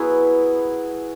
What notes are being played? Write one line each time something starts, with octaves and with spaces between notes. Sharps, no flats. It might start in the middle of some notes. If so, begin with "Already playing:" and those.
Already playing: F#3 B3 E4 G#4 B4